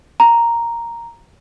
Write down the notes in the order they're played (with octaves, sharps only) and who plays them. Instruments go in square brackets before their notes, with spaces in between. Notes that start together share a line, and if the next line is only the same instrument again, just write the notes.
[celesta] A#5